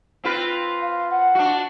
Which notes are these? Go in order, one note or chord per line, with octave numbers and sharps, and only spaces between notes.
C4 F4 B4
F5
F#5
D4 F#4